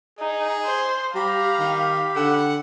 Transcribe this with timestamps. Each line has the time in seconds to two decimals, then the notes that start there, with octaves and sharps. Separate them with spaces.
0.19 D#4 G#4
0.64 C5
1.15 G3 G4 F5 A#5 B5
1.59 D#3
2.16 D3 F#5